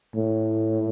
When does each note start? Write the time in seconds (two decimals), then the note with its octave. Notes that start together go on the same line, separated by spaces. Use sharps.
0.16 A2